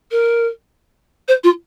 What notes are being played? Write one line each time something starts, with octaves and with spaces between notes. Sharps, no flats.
A#4
C5
F4